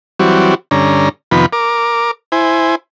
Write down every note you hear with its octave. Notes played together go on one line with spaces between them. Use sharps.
E3 F#3 G3 C4 F#4
G2 D3 C#4 A#5
F2 C3 D#3 F3 B3 B5
A#4 D6
E4 C5 G#5